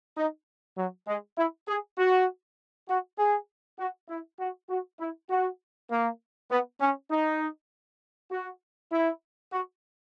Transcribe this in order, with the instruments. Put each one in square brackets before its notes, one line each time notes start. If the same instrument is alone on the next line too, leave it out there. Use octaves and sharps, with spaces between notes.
[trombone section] D#4
F#3
G#3
E4
G#4
F#4
F#4
G#4
F#4
E4
F#4
F#4
E4
F#4
A#3
B3
C#4
D#4
F#4
E4
F#4